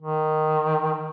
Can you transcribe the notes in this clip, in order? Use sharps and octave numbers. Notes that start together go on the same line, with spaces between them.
D#3